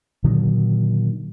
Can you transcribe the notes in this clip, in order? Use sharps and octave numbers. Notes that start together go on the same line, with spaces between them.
A#2 D3 D#3 F#3